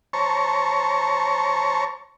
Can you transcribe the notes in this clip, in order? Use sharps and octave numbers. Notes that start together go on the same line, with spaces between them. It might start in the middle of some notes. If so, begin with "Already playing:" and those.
C5 C#5 A5 A#5 C#6